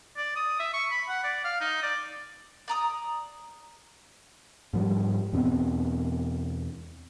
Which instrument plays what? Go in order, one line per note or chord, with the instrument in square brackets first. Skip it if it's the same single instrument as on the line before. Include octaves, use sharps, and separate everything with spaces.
[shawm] D5
D#6
E5
C#6
B5
F#5
D5
F5
D#4
D5
[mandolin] D5 A#5 D#6
[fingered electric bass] G#2 F3 G3
E2 B2 B3 C4